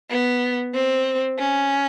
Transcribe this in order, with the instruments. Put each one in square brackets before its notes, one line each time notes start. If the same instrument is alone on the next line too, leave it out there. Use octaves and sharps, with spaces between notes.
[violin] B3
C4
C#4